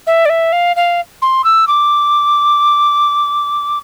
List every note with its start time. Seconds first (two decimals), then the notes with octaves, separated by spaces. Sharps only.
0.07 E5
0.25 D5
0.29 E5
0.52 F5
0.76 F5
1.22 C6
1.44 E6
1.68 D6